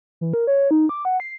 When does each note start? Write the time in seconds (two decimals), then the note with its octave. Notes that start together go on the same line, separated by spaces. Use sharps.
0.21 E3
0.33 A#4
0.47 C#5
0.71 D#4
0.89 D6
1.05 F#5
1.20 C7